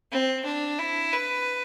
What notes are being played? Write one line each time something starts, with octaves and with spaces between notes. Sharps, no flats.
C4
D4
E4
B4